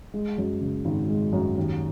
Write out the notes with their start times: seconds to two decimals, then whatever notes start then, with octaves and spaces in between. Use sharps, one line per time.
0.14 G#3
0.38 F#2
0.61 C#3
0.85 G#1
1.09 G#3
1.33 F#2
1.58 D#2